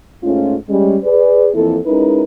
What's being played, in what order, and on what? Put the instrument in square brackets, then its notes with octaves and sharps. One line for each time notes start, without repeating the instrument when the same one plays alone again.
[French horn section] G#2 A3 C#4 F4
G3 G#3 C#4
G#4 B4 D5
F2 E3 A#3 E4 A4
G#3 C#4 D#4 E4 A#4 B4